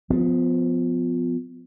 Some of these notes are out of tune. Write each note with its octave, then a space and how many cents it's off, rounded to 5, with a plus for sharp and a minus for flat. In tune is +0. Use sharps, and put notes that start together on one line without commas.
F3 +15 B3 +35